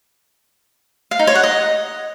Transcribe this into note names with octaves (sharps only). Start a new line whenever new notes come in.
F5
D#4
C#5
F#5
D#5